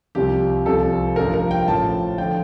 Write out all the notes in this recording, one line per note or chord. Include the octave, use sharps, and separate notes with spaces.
C2 C3 F3 G4
C2 C3 F3 A4
A1 G2 F3 A#4
A#4
G5
A1 A2 F3 A5
D3 F3 G5